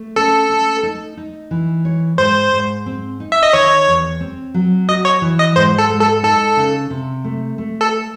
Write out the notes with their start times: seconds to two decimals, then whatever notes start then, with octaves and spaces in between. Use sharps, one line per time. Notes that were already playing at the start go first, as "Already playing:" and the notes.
Already playing: A3
0.16 C#4 A4
0.50 C#4
0.83 D#4
1.17 D#4
1.51 E3
1.85 C#5
2.18 G#2 C5
2.52 G#2
2.86 C4
3.20 D#4
3.32 E5
3.43 D#5
3.53 D#3 C#5
3.87 E2
4.21 C4
4.54 F#3
4.88 F#4 D#5
5.05 C#5
5.22 E3
5.39 D#5
5.56 G#2 C5
5.78 A4
5.90 G#3
6.01 A4
6.23 D#4 A4
6.57 C#3
6.90 C3
7.24 A3
7.58 A3
7.81 A4